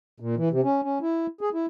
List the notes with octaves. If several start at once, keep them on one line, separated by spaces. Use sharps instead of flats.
A#2
E3
C3
C#4
C#4
E4
G#4
E4